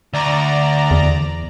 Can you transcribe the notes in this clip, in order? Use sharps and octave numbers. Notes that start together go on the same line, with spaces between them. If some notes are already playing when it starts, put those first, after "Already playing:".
D2 D5 A#5
E2